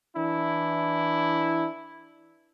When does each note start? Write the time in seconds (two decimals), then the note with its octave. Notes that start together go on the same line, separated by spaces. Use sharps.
0.17 E3 D4 E4